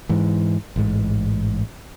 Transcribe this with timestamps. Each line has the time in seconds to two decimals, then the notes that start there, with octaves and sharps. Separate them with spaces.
0.09 G#2 E3
0.76 A1 G#2